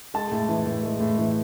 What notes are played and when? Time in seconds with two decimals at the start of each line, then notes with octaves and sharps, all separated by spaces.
0.14 G#3 A5
0.31 A2
0.49 E3
0.66 A2
0.83 G#3
1.00 A2
1.18 E3